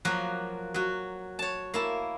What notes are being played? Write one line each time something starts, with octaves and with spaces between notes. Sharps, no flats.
F3 F#3 A#3 F#4 A#4
F#3 F#4
C#5 A5
A#3 E4 A5